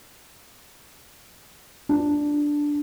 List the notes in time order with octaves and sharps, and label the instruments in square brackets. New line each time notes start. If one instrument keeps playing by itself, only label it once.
[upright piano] D4